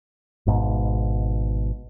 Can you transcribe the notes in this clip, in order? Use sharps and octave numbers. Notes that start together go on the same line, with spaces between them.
G#1 G#2 B2